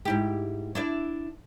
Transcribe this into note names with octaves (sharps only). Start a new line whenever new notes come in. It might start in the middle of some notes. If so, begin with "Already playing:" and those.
G#2 E4 G4
D4 E4 D5